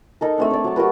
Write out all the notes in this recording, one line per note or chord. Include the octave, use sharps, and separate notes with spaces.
D#4 A4 A#4
A3 C4 D4
C#5 D5
F#3 A5
F#4 G4 A#4 B4